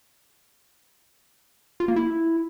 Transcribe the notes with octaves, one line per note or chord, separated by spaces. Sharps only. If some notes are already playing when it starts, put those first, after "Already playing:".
F4
A#3
E4